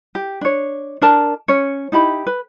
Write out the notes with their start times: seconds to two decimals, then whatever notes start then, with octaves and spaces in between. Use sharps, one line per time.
0.15 G4
0.41 D4 C#5
1.02 D4 A#4 A5
1.48 C#4 C#5
1.92 D#4 E4 G4 B5
2.27 B4